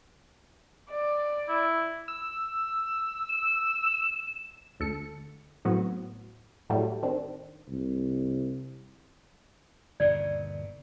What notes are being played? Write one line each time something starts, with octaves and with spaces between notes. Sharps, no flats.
D5
E4
E6
E7
D2 A4 C#7
A2 F#3 B3 C4 F#4
A2 F#3 G3 A3
D#3 C4 D4
C2
G1 D#2 B2 D5